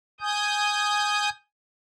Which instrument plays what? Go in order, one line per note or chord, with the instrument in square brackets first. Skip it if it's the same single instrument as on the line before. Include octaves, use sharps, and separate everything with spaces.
[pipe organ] G#5 D#6 G6